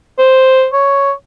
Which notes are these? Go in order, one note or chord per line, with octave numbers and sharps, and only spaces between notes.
C5
C#5